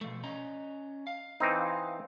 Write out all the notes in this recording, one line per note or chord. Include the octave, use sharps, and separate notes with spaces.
B2 F3 A3
C#4 D#5 A#5
F5
E3 C4 D#4